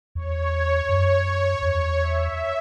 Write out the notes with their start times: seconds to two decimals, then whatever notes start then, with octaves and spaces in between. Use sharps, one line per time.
0.15 E2 C#5
0.89 F#2
1.62 E2 C#5
1.99 E5